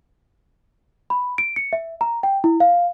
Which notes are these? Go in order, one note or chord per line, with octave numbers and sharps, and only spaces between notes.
B5
D7
C#7
E5
A#5
G5
E4
F5